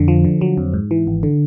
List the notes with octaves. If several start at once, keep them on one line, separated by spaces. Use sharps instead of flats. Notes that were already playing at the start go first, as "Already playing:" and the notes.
Already playing: F2 D3
F3
D3
F#3
F2
G#2
E3
G#1
D3